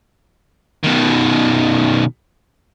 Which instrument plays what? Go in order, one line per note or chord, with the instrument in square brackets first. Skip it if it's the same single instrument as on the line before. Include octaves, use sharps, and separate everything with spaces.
[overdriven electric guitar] B2 D#3